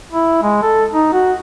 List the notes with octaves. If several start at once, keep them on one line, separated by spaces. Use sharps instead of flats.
E4
G#3
A4
D#4
F#4